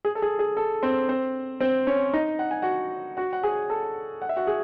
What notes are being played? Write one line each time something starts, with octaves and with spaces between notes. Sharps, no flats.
G#4
A4
G#4
G#4
A4
C4 C5
C4 C5
C4 C5
C#4 C#5
D#4 D#5
F#5
G#5
F#4 F#5
F#4 F#5
F#5
G#4 G#5
A4 A5
F#5
E5
F#4 F#5
G#4 G#5